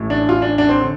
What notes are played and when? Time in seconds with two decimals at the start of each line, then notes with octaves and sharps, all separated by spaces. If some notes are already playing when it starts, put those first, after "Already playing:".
Already playing: A1 A2
0.10 D4
0.29 F4
0.42 D4
0.58 D4
0.69 C4
0.81 D3